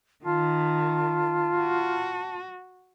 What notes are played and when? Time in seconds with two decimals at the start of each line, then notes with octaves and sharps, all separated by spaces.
0.25 D#3 F4 A5
1.57 F#4